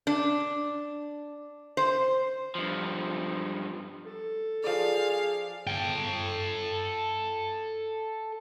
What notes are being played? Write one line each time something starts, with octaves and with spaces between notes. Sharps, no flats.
D4
C5
G2 F3
A4
F3 G#4 D5 F5
A4 G5